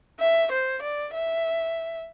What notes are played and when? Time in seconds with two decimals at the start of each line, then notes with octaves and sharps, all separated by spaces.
0.20 E5
0.51 C5
0.82 D5
1.14 E5